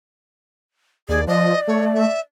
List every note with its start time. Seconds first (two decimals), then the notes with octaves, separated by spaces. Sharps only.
1.09 D#2 G#4 D5
1.27 F3 D5 D#5
1.67 A3 C#5
1.94 E5